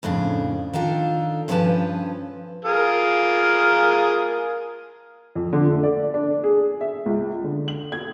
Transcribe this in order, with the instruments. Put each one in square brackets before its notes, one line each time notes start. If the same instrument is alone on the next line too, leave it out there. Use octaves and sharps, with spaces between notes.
[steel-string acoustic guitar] F2 A2 C#3 D4
D#3 D4 F4 A4
G2 F3 C4 C#4 B4 A5
[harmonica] F4 G#4 A#4
[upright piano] F2
D3
A3
D5
D4
G#4
E5
C#2
D3
F#7
G#6